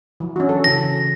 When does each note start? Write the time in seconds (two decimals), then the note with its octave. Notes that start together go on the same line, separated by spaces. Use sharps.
0.20 E3 F#3
0.36 C#4 D4 F#4
0.49 A4
0.64 C#3 E3 A#6